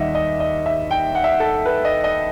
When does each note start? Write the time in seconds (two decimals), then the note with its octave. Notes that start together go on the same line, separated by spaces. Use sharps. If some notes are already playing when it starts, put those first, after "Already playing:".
Already playing: D#2 D#3 G3 D#5 E5 F#5
0.15 D#5
0.40 D#5
0.66 E5
0.91 G5
1.15 F#5
1.24 E5
1.32 F#5
1.40 A4
1.66 B4
1.85 D#5
2.04 D#5